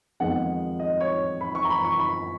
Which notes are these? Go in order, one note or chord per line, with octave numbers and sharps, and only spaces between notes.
F2 D#3 G#3 B3 F#5
D#5
C#5
B5
C#6
A#5
B5
C#6
B5